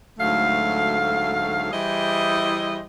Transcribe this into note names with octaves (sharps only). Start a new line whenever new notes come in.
D2 G#2 F#3 A3 F5
E3 G3 E4 G#4 C5 D#5